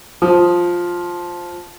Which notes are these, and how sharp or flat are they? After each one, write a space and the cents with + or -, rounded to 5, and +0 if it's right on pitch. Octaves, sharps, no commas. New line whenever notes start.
F3 +5 D#6 +0